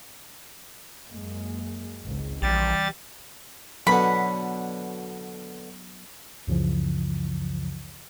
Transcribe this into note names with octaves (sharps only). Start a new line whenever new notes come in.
F#2 G#3 A#3
G#1 C#2
A#1 E3 G3 A6
B2 D3 F#3 B3 D4 B5
C#2 F#2 C#3 E3 F3